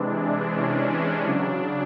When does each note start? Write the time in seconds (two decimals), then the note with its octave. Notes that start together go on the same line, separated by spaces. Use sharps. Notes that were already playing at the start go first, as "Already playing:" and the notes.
Already playing: C3 E3 G#3 D4
0.55 C#4
0.91 C#4
1.25 C#3 F#3 D4